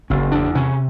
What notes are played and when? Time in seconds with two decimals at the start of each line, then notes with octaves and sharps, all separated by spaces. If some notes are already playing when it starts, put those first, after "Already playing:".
0.10 F#1 C#4
0.32 E2 D4
0.55 C3 C#4